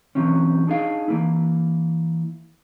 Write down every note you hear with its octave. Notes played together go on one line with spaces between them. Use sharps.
B1 E3 F#3 C4 C#4
D4 D#4 G#4 F5
E3 A#3 E4